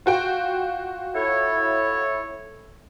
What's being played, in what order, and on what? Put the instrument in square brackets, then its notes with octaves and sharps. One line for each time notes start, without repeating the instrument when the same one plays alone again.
[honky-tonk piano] F4 F#4 G5
[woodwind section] E4 A4 C#5